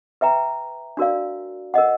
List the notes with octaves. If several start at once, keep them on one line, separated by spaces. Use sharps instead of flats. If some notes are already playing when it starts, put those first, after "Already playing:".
B4 E5 G5 A#5
D4 F#4 A#4 D5 F5
A#4 D#5 F#5